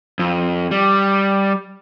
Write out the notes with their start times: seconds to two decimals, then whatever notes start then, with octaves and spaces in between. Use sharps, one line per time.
0.19 F2
0.71 G3